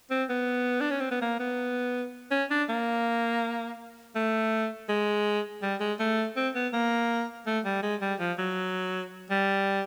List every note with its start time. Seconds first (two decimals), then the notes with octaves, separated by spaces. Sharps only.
0.11 C4
0.29 B3
0.81 D4
0.91 C#4
1.01 C4
1.11 B3
1.22 A#3
1.40 B3
2.31 C#4
2.51 D4
2.69 A#3
4.16 A3
4.89 G#3
5.63 G3
5.80 G#3
6.00 A3
6.36 C4
6.55 B3
6.73 A#3
7.47 A3
7.65 G3
7.83 G#3
8.02 G3
8.20 F3
8.38 F#3
9.30 G3